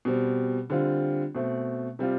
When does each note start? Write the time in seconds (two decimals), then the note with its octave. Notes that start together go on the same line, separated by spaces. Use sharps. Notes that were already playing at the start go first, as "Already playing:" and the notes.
0.05 B2 G3 C4
0.70 D3 G3 C4 F4
1.35 B2 A3 C4
1.99 C3 G3 C4 F4